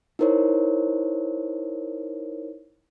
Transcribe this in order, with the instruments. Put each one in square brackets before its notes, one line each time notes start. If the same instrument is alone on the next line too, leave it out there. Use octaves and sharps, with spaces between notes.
[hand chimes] D#4 E4 A#4 C5 C#5